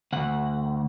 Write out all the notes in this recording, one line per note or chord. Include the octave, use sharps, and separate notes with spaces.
D2 F#5